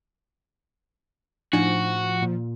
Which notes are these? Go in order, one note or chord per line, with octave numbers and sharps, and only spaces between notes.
A2 F3 D4 D#4 F#4 G#5
A#2